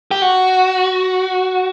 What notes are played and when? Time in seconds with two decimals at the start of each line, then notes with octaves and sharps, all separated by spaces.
0.11 G4
0.22 F#4